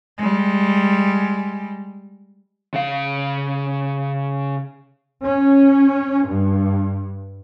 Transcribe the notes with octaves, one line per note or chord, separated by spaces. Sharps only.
G3 G#3
C#3 F5
C#4
G2